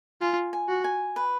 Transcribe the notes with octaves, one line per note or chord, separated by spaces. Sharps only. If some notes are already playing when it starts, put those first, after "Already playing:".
F4 G#5
G#5
F#4
G#5
B4